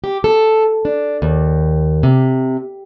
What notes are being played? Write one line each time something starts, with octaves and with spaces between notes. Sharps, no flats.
G4
A4
D4
D#2
C3